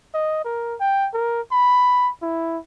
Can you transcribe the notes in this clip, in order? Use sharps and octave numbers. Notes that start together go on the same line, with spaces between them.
D#5
A#4
G5
A#4
B5
E4